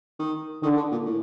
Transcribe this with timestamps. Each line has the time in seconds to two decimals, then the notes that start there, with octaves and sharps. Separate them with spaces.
0.19 D#3
0.63 D3 D#3
0.77 D3
0.91 A#2
1.06 A2